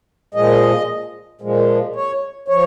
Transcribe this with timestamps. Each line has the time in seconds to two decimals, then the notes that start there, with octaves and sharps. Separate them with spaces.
0.34 A#2 F3 G#3 D#5
1.41 A#2 F3 G#3
1.96 C#5
2.48 F3 C#5